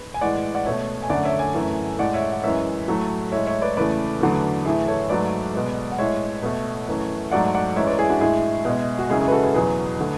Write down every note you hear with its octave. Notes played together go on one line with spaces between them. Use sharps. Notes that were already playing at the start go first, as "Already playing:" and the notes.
Already playing: B4
G#5
A2 E3 G#3 D5 F#5
D5 F#5
B2 A3 C#5 E5
G#5
F#2 D3 A3 D5 F#5
C#5 E5
E5 G#5
F#2 E3 A3
A2 G#3 D5 F#5
C#5 E5
F#5
F#2 E3 G#3 C#5 E5
A2 F#3 A3
A2 G#3 C#5 E5
C#5 E5
B4 D5
E2 C#3 E3 A3 B4 D5
E2 D3 F#3 A3
A2 E3 A3 E4 G#4
A4 C#5
G#2 F#3 A3 B4 D5
B2 G#3
F#5
A2 G#3 C#5 E5
B2 A3
F#2 E3 A3
G#2 F#3 A3 D5 F#5
D5 F#5
F#2 E3 G#3 C#5 E5
B4 D5
E4 G#4
D4 F#4
A2 G#3 E4 G#4
B2 G#3
F#4
F#2 C#3 G#3 E4 G#4
E4 G#4
B4
F#4 A4
G#4 B4
E2 B2 F#3 G#4 B4
D3 A3